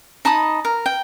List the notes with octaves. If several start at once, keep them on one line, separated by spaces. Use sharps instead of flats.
D#4 A5 B5 D#6
A#4
G5